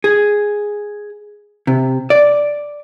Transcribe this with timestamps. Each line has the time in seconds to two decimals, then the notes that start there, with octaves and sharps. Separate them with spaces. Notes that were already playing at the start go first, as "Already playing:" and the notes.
0.04 G#4
1.67 C3
2.10 D5